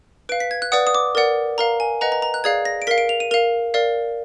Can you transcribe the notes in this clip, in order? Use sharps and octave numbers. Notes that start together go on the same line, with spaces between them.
B4 F5 D7
B6
G#6
F#6
B4 D5 F#5 D#6
D#6
D6
A#4 D5 F#5
A#4 F5 A#5
G#5
B4 D#5 F#5 A#5
A#5
A#5
F#6
G#4 D5 F5 G#6
A#6
D7
A#4 F5 B6
D7
F7
D#7
A#4 F5 F7
A#4 D5 F5